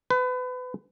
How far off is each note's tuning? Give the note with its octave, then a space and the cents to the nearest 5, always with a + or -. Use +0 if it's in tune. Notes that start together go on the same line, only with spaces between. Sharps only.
B4 +30